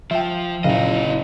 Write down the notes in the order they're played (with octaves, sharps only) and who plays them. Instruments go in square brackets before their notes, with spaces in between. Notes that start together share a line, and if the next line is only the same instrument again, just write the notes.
[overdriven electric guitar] F3 [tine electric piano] E5 G5
[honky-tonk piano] F#1 [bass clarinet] A#2 [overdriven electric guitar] E4 D#5 [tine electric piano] F5